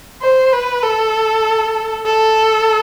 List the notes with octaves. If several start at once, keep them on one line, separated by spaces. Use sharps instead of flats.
C5
B4
A4
A4